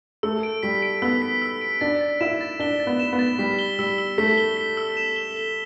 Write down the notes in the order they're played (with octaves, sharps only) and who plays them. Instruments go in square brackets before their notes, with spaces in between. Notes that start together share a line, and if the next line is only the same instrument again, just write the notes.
[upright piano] A3 [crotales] E6
[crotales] D7
[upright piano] G3 [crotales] B6
[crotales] D7
[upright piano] B3 [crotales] E6
[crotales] B6
E6
D7
[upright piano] D4 [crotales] A6
[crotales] A6
[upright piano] E4 [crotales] E7
[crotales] A6
[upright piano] D4 [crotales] G7
[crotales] A6
[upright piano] B3
[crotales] E7
[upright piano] B3
[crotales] A6
[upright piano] G3 [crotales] B6
[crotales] G7
[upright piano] G3 [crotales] E6
[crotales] E6
[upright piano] A3 [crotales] B6
[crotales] G7
B6
E6
E7
G7
G7